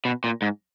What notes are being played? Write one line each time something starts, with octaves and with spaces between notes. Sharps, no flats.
B2
A#2
G#2